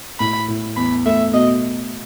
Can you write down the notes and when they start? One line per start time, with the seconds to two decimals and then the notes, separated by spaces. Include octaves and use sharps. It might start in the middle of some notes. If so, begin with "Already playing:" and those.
0.20 A2 B5
0.48 A2
0.76 E2 B5
1.05 A3 E5
1.33 B2 D#5